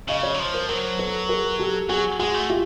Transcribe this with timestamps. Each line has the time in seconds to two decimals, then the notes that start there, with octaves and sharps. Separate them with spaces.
0.08 C#3 D#5 F5
0.23 C#5 D#5
0.34 F#3
0.39 F3
0.54 A#4 C5
0.69 F#3 A#4 C5
0.99 A4 B4
1.29 G#4 A#4
1.59 G4 A4
1.89 F#3 F#4 G#4
2.19 G#3 F#4 G#4
2.34 A3
2.50 F4 G4